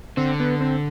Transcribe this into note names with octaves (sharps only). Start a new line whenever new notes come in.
D3 C4
B3
C4